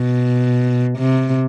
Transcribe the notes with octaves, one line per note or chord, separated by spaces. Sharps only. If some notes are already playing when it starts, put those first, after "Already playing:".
Already playing: B2
C3